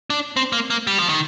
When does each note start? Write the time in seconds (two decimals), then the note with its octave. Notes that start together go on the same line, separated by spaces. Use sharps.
0.10 D4
0.37 C4
0.53 A#3
0.70 A#3
0.87 G3
0.99 F3
1.09 D#3